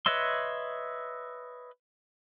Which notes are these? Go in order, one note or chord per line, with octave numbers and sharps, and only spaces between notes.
B4 C#5 D#5 E5 C6